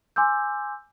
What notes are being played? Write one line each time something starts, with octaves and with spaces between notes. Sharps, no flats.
G#5 C6 D6 E6 G6